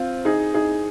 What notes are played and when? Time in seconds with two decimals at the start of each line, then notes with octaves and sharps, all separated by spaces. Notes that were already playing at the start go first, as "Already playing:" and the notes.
Already playing: C4 F4
0.25 D#4 G#4
0.54 D#4 G#4